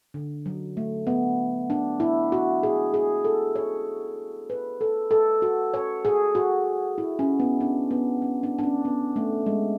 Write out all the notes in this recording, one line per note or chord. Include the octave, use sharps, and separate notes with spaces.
D3
F#3
A3
B3
D4
E4
F#4
G#4
G#4
A4
C#5
B4
A4
A4
F#4
C#5
G#4
F#4
E4
C#4
B3
D4
B3
C#4
D4
D4
C#4
B3
A3
G#3